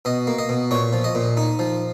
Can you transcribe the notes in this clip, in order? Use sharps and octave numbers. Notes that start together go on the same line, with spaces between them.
B2 D#5
A#3
D#5
B2
A#2 C#5
F3
D#5
A#2
D#4
F3